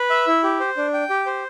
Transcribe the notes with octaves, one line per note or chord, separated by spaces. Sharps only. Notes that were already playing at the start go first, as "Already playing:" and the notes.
Already playing: B4
E5
E4
G4
C5
D4
G5
G4
C5